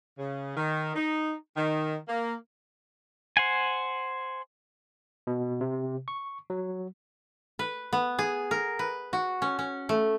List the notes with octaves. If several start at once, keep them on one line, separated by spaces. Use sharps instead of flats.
C#3
D#3
D#4
D#3
A#3
C5 F#5 G#5
B2
C3
C#6
F#3
B4
B3
G#4
A#4
B4
F#4
C#4
C#4
A3